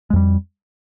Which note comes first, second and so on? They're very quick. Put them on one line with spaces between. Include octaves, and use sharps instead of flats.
G#3 F2 G3